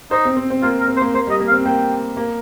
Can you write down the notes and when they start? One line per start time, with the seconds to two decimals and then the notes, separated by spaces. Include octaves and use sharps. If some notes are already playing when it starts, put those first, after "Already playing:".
0.11 D#4 C5
0.25 C4
0.37 C4
0.50 C4
0.62 A#3 F4
0.80 A#4
0.88 C4
0.97 C5
1.01 A#3
1.14 A#3 C5
1.27 G3 D#5
1.40 A#3
1.48 F5
1.52 C4
1.65 A#3 G5
2.17 A#3